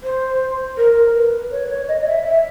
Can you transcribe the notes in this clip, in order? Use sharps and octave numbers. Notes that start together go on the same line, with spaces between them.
C5
A#4
B4
C#5
C#5
D#5
D#5
E5
E5